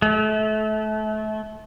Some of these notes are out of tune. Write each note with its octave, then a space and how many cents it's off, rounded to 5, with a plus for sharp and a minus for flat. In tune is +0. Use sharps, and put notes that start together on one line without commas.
A3 -30